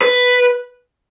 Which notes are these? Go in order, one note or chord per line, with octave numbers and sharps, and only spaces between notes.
B4